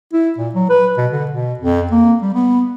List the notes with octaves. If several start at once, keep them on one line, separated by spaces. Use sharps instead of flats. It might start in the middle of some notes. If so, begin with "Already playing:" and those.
E4
A#2
F#3
B4
B2
D3
B2
F2
A#3
G3
B3